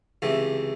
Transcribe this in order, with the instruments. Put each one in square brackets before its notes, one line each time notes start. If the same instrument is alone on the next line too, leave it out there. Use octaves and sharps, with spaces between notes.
[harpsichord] C#2 C3 E3 A3